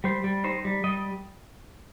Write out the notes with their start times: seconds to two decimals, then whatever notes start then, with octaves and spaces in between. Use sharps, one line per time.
0.04 G3 C5
0.24 G3
0.44 D#4 C5
0.65 G3
0.84 G3 D#5